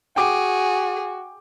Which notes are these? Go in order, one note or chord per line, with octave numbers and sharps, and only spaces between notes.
F#4 G#4 G5 D6